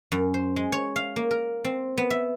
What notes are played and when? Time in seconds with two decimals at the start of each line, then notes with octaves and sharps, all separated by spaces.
0.12 F#2
0.34 C5
0.56 G#3
0.72 C#5
0.96 F5
1.16 A#3
1.31 A#4
1.64 C4
1.98 B3
2.10 E5